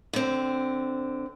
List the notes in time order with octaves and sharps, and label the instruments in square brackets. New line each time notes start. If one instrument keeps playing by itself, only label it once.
[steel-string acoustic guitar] D3 C4